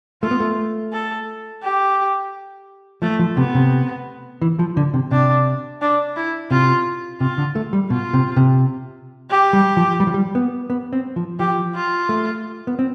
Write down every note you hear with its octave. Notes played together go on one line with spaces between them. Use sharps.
A3 F4
B3
A3
A4
G4
F3 A3
F3
C3 B3
C3
E3
F3
D3
C3
C3 D4
D4
E4
C3 F4
C3 F4
D3
A3
G3
B2 F4
C3
C3
G4
G3
F3
G3
F3
G3
B3
B3
C4
F3
F3 G4
F4
A3
B3
C4